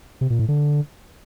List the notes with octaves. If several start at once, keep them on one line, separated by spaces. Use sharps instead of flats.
C3
A#2
A2
D3